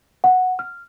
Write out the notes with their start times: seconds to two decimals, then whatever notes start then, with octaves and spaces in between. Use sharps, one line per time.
0.24 F#5
0.59 F6